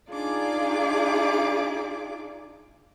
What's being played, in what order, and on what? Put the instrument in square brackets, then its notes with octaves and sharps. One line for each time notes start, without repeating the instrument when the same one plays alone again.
[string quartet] D4 D#4 F4 G#4 D5 D6